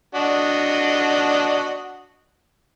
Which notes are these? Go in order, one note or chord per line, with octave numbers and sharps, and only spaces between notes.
D4 F#4 D#5